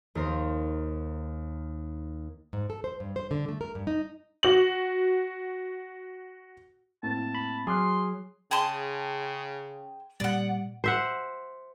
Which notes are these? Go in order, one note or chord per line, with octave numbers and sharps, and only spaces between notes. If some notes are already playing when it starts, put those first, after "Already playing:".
D#2 A#4 C5
G#2
A4
C5
G2
C5
D3
A3
A#4
G2
D#4
F#4 F#7
A2 A#3 C4 A5
B5
F#3 G#4 C6 D6 F6 F#6
C#3 G#4 G5 A5 C6
A#2 G3 D5 F#5
C5 E5 F#5